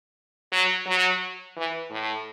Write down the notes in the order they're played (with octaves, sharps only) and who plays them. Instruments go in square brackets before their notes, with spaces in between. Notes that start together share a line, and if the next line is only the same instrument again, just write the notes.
[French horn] F#3
F#3
E3
A2